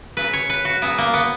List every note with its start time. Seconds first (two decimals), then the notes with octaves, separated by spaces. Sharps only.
0.17 C#3 F#3 B4
0.33 C#5
0.50 B4
0.65 F#4
0.82 C#3 F#3 B3
0.98 A#3
1.14 B3